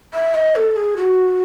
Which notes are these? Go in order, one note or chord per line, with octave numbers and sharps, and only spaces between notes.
E5
D#5
A4
G#4
F#4